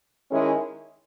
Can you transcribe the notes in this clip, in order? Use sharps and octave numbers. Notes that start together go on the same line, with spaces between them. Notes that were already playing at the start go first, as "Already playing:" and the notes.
D#3 G#3 C#4 E4 G#4